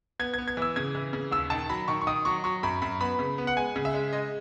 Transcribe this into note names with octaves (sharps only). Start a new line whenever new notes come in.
B3 G#6
B3 G#6
G#6
E3 E6
C#3 G#6
E3
C#3
D#2 E6
D#3 A5
F#3 B5
D#3 C#6
C#6
D#3 D#6
F#3 C#6
F#3 C#6
F#2 B5
F#2 B5
B3 B5
C#3
B3
F#5
G#3 G#5
C#3
E5
G#3
G#3 D#5